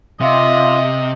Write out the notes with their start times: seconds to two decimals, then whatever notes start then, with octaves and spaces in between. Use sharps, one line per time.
0.21 C3 F4 D#5 E5